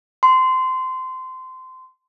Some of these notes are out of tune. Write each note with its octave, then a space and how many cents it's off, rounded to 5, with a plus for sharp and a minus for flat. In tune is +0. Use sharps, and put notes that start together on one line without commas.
C6 -20